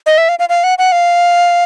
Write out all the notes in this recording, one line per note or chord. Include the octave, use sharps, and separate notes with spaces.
D#5
E5
F5
F5
F5
F#5
F#5
F5